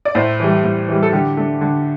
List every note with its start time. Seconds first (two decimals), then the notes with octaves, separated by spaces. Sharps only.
0.05 D5
0.15 A2 C5
0.40 E3 G3
0.64 A2
0.88 E3 G3
1.03 A4
1.13 D3 G4
1.37 A3 D4
1.61 D3